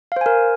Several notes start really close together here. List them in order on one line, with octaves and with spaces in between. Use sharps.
F5 C5 G#5 A#4